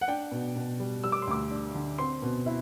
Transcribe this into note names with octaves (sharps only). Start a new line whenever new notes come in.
F#5
D4 G5
B2
B2
G3
G3 E6
D6
C6
D2 D6
D4
D3
C4 C6
B2
E4